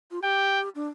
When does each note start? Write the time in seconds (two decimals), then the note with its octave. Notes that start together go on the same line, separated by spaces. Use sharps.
0.11 F4
0.22 G4 G5
0.75 D4